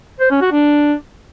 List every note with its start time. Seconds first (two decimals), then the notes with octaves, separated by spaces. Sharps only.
0.20 C5
0.31 C#4
0.41 F#4
0.52 D4